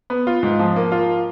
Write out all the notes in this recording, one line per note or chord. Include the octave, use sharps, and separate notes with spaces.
B3
F4
G#2
F3
A#3
F4